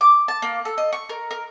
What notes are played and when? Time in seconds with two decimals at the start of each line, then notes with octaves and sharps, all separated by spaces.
0.01 D6
0.28 A5
0.42 A#3
0.65 A4
0.78 D#5
0.93 C#6
1.09 A#4
1.31 A#4